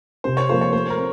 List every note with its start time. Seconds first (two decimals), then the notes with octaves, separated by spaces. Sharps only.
0.24 C3 C5
0.37 C#5
0.49 F3 A#3 F4 A4 C5
0.61 C#5
0.73 A3 C5
0.90 A#4
0.98 C4